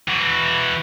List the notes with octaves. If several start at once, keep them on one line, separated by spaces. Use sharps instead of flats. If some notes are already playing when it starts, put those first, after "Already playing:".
E3 F#4